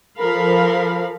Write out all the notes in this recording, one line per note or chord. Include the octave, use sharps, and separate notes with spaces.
F3 A4 A#4 F5 B5